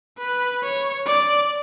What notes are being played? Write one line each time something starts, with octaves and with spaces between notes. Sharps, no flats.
B4
C#5
D5